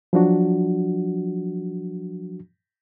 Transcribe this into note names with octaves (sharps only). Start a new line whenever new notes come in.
F3 F#3 D4 F#4